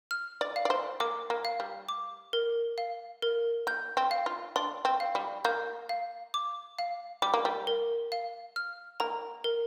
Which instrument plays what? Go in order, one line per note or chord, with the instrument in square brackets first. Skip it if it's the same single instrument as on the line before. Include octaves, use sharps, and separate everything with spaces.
[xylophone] F6
[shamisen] D5
[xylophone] F5
[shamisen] D5
C5
[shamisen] A#3 [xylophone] D6
[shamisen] A#3
[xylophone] F5
[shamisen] G3
[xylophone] D6
A#4
F5
A#4
[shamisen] A#3 [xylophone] G6
[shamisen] C4
[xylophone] F5
[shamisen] F4
[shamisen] D4 [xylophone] C6
[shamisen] C4
[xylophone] F5
[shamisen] G3
[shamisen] A#3 [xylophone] G6
[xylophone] F5
D6
F5
[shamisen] G3 [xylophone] D6
[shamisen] A#3
G3
[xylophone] A#4
F5
F6
[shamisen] A#3 [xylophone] A#5
[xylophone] A#4